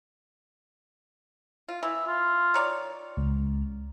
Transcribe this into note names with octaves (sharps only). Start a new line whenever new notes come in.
F4
E3 E5
F4
D#3 C#5 D5
C#2